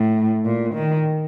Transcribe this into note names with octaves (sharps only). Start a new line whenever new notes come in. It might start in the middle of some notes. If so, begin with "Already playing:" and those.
Already playing: A2
A#2
D#3